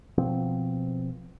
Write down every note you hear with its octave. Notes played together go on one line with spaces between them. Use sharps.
B2 F3 C4